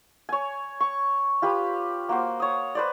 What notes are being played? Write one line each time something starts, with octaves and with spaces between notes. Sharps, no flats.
C#5 G#5
C#6
F4 G4 B4 B5
A#3 F#4 C5
C#5 D#6
B4 C5 D5